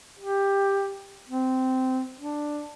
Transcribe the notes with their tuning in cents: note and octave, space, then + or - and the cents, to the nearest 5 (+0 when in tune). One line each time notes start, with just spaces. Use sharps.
G4 +10
C4 -15
D4 +10